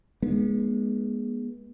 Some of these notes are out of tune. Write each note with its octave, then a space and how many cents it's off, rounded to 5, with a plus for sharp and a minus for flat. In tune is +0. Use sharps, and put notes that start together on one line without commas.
G#3 +0 B3 -40 D4 +45